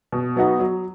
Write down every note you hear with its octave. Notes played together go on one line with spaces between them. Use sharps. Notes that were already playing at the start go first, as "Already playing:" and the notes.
B2
F#3 B3 D#4 F#4
F#3